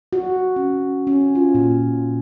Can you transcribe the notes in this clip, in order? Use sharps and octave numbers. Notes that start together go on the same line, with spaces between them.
F#4
C#4
C#4
F4
A#2